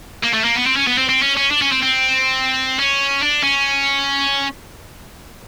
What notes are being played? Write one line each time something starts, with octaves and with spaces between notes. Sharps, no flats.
A#3
A3
A#3
B3
C4
C#4
B3
C4
C4
C#4
C#4
D4
C#4
C4
C4
C#4
D4
C#4